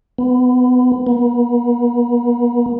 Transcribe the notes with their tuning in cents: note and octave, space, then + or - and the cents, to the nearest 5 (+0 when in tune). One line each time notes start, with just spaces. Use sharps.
B3 +25
B3 -45